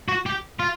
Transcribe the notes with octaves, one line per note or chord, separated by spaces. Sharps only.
F#4
G4
F4